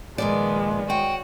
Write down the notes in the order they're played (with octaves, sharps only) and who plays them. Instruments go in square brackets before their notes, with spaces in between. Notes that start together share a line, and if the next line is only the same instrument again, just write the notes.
[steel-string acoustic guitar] A#2 F3 D5 [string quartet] D#3 B3 [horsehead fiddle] G#3
[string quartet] F#4 C#5 [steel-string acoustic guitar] G5